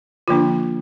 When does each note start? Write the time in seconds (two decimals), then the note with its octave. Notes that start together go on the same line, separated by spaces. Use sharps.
0.28 D3 F3 A#3 D4 F4